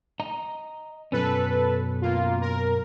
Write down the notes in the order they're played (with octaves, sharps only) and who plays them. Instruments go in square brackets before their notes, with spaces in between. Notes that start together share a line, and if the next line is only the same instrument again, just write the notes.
[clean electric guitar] D#5 A#5
[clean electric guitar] F#2 B2 C#4 [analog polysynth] A4 B4
[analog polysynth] A#3 F4
A#4